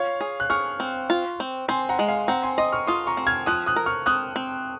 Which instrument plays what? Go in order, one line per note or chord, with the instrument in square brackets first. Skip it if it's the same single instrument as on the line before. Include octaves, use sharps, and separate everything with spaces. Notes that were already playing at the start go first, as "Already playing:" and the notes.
Already playing: [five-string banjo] F4 [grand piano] C#5 F5
[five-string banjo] G#4
[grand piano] F#6
[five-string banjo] G#4 [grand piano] C#6 F6
[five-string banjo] C4
F4
C4
[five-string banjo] C4 [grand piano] G#5 C6
[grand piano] F#5 A#5
[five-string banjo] G#3
[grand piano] F5 G#5
[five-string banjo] C4 [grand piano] F#5 A#5
[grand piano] G#5 C6
[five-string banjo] D#5 [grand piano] C6 D#6
[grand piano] C#6 F6
[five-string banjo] F4 [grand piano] C6 D#6
[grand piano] A#5 C#6
[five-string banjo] C4
[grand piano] F6 G#6
[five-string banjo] F3 [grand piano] D#6 F#6
[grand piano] D#6 F#6
[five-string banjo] A#4
[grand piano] C#6 F6
[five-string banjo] C4 [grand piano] D#6 F#6
[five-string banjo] C4